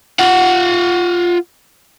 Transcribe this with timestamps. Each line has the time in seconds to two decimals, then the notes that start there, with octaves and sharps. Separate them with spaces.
0.19 F4 F#5